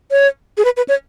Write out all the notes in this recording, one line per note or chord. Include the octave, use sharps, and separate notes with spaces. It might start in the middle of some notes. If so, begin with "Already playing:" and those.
C#5
G#4
B4
B4
C#5